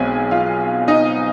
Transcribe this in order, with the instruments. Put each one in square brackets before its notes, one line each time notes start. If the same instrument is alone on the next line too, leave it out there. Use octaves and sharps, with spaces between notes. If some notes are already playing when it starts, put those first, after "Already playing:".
Already playing: [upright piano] B1 B2 G#3 C4 G#4 G#5
F4 F5
D#4 D#5